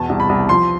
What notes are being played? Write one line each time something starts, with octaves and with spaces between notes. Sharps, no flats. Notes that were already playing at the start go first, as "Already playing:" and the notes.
Already playing: E2 B2 A5
C2
B5
C2
F3 C6